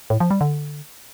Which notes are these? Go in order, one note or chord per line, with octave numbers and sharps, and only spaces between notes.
A2
F3
G3
D3